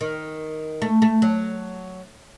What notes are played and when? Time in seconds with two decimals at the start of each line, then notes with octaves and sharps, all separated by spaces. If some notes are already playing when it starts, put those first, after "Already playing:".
0.01 D#3
0.82 A3
1.02 A3
1.22 F#3